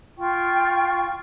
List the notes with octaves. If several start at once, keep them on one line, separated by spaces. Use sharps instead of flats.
F4 G5 C#6